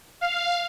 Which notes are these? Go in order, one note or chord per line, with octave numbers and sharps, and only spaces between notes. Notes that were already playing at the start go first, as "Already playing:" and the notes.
F5